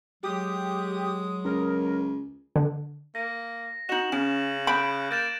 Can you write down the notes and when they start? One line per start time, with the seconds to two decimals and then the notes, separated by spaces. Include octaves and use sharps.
0.23 F#3 G#3 G4 D#6
1.45 C#2 A#4
2.56 D3
3.15 A#3 A#6
3.89 D#4 F#4 D#5 E7 F#7
4.12 C#3 C#4
4.67 B5 F#6 G6 D7
5.11 A#3 G6 A6 E7